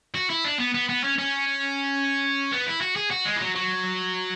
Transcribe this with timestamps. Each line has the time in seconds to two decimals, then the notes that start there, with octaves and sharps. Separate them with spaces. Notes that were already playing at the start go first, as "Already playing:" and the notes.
0.15 F#4
0.30 E4
0.44 D4
0.59 B3
0.74 B3
0.89 B3
1.04 C#4
1.19 C#4
2.52 B3
2.67 E4
2.81 F#4
2.96 G#4
3.11 F#4
3.25 G#3
3.36 E3
3.41 F#3
3.55 F#3